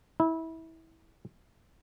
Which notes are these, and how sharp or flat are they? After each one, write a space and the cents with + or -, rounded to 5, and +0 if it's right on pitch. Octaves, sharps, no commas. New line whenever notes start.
E4 -25